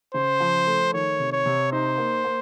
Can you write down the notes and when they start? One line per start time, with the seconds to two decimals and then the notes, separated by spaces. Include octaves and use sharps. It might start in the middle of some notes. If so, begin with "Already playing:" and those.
0.14 C#3 C5
0.40 F3
0.66 A3
0.93 D#3 C#5
1.19 C3
1.32 C#5
1.46 C3
1.72 D#4 C5
1.98 A#3
2.24 A#3